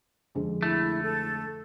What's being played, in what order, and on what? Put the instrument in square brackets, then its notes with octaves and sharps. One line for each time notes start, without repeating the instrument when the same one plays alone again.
[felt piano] F2 D3 G#3
[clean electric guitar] A3 [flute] E4
[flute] A4